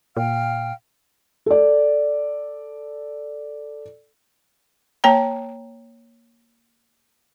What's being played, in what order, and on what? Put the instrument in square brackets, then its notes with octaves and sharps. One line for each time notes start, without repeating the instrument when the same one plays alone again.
[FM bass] A#2 [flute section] F5 G5 F6
[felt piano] A4 D5
[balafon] A#3 C#5 G5 A#5